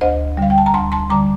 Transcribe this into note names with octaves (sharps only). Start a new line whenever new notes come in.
D2 C5 D#5
D3 G3 F5
G5
A5
A#5
D2 A5 C6
A5 C6
D3 G3 A#5 D6